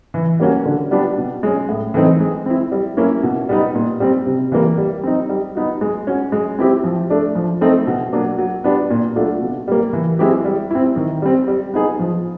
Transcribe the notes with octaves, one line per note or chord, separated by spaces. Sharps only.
E3
G3 A#3 C#4 F#4
D3
G3 B3 D4 G4
B2
G#3 C#4
A2
E3 A3 C4 D#4
G#3
C4 E4
G3
A#3 C#4 E4
B2
G3 B3 D#4
A#2
G3 C4
C3
E3 G3 A#3
G3
C4 D#4
G3
B3 D#4 F#4
G#3
C#4 F#4
G#3
C4 E4 G4
F3
A3 D4
F3
A3 C4 D#4
B2
F#3 A#3 D4
F#3
B3 D4 G4
A#2
F#3 A3 D4 F4
B2
G3 A#3
E3
G#3 C4 E4 G4
G3
C4 E4
D#3
G3 C4
G3
B3 D#4 G#4
F3